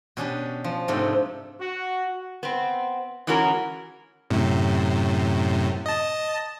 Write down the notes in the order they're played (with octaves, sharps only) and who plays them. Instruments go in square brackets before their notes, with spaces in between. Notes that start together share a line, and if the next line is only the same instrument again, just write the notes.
[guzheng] B2 C#4 D4 G4
F3
G#2 C3 A3 C4 D4
[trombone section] F#4
[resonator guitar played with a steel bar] B3 C4
E3 G#3 C#4 F#4 A#4
[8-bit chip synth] F#2 A2 C3
D#5 A5